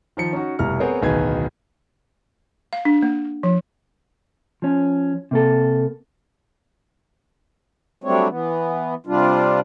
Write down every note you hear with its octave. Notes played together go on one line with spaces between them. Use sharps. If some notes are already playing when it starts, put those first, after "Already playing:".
D#3 F3 C#7
C#4 D#4 F#4
F1 B2 G3 E4 A#5 F6
B3 C4 G#4 A#4 C5 C#5
D1 B1 D#3 G#4 B4 G#6
F5
D4
A#3
F3
F3 C#4
C3 A#3 A4
F#3 G3 A3 C4 D4 C#5
E3 B3
C3 G3 D4 F4